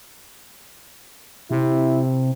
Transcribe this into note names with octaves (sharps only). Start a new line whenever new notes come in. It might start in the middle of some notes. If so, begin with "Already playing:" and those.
C3 E4